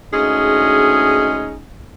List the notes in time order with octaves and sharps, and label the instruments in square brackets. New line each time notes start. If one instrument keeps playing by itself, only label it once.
[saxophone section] D2 G#3 C#4 D#4 G#4